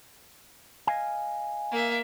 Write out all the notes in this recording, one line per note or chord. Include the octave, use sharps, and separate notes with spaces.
D#5 F5 G#5
A#3 E5